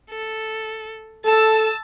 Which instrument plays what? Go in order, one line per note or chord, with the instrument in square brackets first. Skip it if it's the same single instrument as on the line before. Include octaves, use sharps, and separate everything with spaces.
[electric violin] A4
[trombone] A4 [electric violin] A5 E6